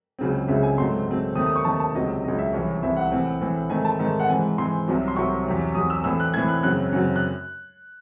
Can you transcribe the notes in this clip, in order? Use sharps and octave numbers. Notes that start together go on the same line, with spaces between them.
C#2 C#3 F#3 C4
C#2 C#3 F#3 C4 E5
G#5
G#2 F#3 A3 C4 C6
G#2 F#3 A3 C4
D#2 D#3 A3 C4 D#6
D#6
C#6
D#2 D#3 A3 C4 A5
A5
C#2 C3 F#3 D#5
C#2 C3 F#3 D#5
E5
C2 C3 E3 C#5
C2 C3 E3 E5
F#5
A2 E3 C4
A2 E3 C4
G#2 D#3 A3 C4 G#5
A5
G#2 D#3 A3 C4
F#5
G#2 E3 C4 G#5
G#2 E3 C4 C6
C2 C3 F#3
C6
C2 C3 F#3 C#6
E2 C3 F#3
E2 C3 F#3 D#6
E6
A2 E3 C4 E6
F#6
A2 E3 C4 G#6
F#6
F#2 C#3 F#3 C4 F#6
F#2 C#3 F#3 C4
F#6